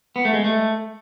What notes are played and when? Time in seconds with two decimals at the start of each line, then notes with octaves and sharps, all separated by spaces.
0.16 B3
0.25 A3
0.34 G#3
0.44 A3